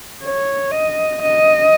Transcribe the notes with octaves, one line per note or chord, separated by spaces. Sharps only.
C#5
D#5
D#5